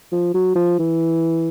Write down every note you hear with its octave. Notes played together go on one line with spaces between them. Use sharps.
F3
F#3
F3
E3